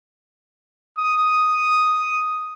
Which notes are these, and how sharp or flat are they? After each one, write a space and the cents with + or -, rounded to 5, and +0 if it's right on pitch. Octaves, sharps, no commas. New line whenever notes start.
D#6 +0